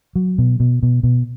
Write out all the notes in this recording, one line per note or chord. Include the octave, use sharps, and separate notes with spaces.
F#3
B2
B2
B2
B2